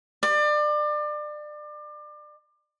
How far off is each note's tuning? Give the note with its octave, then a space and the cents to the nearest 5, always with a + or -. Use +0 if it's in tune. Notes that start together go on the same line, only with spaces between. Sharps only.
D5 +30